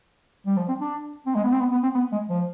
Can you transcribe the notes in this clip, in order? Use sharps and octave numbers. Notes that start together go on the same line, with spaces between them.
G3
F3
C4
D4
C4
G#3
B3
C4
B3
B3
C4
B3
G#3
F3